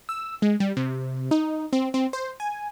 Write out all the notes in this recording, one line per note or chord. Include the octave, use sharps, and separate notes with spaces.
E6
G#3
G3
C3
D#4
C4
C4
C5
G#5